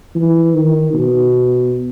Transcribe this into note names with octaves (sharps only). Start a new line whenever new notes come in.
E3
D#3
B2